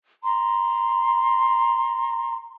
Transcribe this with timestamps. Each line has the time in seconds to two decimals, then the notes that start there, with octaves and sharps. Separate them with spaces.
0.24 A#5 C6